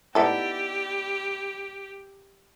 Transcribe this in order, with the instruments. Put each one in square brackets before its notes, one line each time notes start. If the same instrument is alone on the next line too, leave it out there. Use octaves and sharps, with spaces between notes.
[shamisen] B3 D#4 A4 [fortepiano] E4 D5 E5 [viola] G4